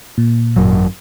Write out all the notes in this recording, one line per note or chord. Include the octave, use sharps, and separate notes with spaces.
A#2
G#1 F#2 F#3